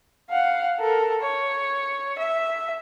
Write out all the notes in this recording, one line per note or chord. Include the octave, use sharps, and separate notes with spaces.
F5 F#5
A4 A#4
C#5
E5